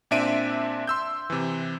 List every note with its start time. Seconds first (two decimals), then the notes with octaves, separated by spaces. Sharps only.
0.11 A#2 C4 D4 E5 D7 D#7
0.87 C6 E6 G6
1.30 C3 E3